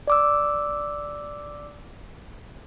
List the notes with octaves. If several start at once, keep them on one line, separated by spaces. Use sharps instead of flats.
D5 D6 E6